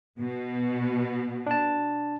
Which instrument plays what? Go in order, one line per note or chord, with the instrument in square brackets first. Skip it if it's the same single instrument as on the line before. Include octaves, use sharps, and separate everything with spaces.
[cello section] B2
[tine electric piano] D4 A5